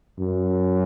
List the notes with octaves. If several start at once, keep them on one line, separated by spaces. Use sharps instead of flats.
F#2